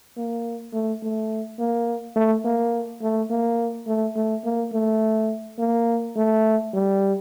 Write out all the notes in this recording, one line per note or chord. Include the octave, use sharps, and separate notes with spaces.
A#3
A3
A3
A#3
A3
A#3
A3
A#3
A3
A3
A#3
A3
A#3
A3
G3